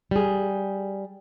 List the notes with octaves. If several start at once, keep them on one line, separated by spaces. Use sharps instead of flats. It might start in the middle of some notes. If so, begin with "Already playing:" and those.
G3 G#4